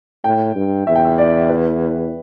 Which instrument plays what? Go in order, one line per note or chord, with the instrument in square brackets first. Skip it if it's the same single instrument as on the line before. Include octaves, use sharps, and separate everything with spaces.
[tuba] A2 [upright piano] G5
[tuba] G2
[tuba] E2 [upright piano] E5
[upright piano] G5
E5
D5
B4